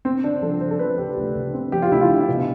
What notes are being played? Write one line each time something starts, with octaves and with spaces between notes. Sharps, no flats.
C4
D3 D4
F3 A4
F3 C5
A4
C4 B4
D2 G4
D2
D2
C4
F3 G4
F4
D2 E4
F4
D3
B2